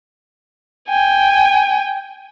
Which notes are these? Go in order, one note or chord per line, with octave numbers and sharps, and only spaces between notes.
G5 G#5